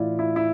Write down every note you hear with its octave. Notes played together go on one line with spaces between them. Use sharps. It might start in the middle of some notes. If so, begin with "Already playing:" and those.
Already playing: A2 E3 E4 F4 D5
E4
E4